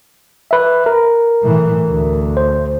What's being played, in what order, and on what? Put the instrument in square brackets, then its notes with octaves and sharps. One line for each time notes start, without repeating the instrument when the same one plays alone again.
[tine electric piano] B4 E5
A#4
[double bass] A2 E3
D2
[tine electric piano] C5